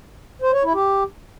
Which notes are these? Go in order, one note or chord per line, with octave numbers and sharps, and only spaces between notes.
C5
C#5
E4
G4